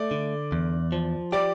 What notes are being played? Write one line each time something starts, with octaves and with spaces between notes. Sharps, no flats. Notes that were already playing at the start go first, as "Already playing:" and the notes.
Already playing: A3 D5
D3
E2
F3
G4 D5